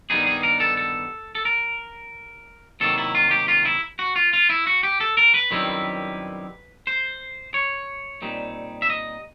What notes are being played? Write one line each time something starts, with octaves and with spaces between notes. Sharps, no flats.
G2 D#3 G3 B3 D#4 G#4
G#4
A#4
A4
A4
A4
A#4
C3 D#3 F#3 A#3 A4
E4
F4
G4
F4
E4
F#4
F4
F4
E4
F#4
G4
A4
A#4
B4
F#2 D#3 G3 C4 E4
C5
C#5
A#2 G3 C4 D#4
E5
D#5